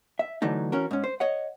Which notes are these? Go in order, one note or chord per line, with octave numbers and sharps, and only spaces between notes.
E5
D3 E3 F#3 A3 D#4
E3 C#4 F#4 A#4
G#2 C#4
C5
C#5 D#5 F#5